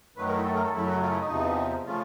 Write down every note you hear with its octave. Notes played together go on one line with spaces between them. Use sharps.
F#2 D#3 F#3 A3 B4
A#4
E4
A4
A#4
A4
F#2 C#3 F#3 A3 E4
F#4
F4
E4
D#4
E2 C3 F3
C#3 F3 A3 F4